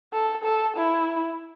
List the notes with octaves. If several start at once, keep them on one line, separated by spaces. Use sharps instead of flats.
A4
A4
E4